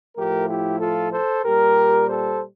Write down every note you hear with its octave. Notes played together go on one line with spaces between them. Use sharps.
A2 F3 A3 G4 A#4
E4 G4
F4 A4
A4 C5
A#2 G3 G4 A#4
A4 C5